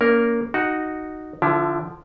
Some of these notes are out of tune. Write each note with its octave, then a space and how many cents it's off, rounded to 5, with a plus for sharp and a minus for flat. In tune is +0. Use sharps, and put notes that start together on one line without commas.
A#3 +0 C#4 +30 A#4 +0
D#4 -5 F#4 +0 F#5 +0
D3 +0 F3 +0 E4 +25